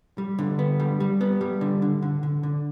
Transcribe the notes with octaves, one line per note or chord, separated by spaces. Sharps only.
G3
D3
B3
G3
G3
B3
G3
D3
D3
D3
D3
D3